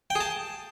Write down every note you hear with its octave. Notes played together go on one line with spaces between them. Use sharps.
G5
G#4
A5